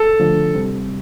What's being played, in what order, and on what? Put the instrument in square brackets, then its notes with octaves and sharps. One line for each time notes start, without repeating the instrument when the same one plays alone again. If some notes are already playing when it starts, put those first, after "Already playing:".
Already playing: [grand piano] A4
[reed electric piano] D3 F3 A3 D4
C3 G3 C4